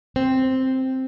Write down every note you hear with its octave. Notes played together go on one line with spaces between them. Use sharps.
C4